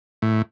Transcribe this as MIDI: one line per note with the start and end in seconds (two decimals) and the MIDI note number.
0.22 0.42 45